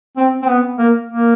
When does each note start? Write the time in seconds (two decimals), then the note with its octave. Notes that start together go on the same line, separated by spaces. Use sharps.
0.17 C4
0.42 C4
0.48 B3
0.78 A#3
1.09 A#3